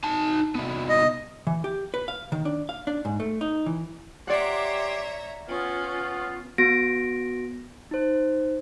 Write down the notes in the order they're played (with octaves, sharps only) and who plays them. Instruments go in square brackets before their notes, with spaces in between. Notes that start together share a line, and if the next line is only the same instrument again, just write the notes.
[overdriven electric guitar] D#4 A5
C2 B3
[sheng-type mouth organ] D#5
[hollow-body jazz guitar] E3
G4
B4
F5
D#3
D4
F5
D4
G#2
A3
D#4
E3
[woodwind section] G4 C6 D6 [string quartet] C#5 E5 A#5 [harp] D5 F#5
[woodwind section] B3 F4 [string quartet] C#4
[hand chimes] B3 F#4 A#6 D7
D#4 C5